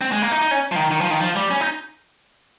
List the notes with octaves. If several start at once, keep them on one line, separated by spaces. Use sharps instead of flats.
C4
G#3
A#3
D#4
D#4
C#4
F3
D#3
D#3
F3
D#3
F3
G3
C#4
D#4